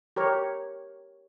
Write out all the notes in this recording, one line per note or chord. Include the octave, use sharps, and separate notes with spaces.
G4 A#4 C#5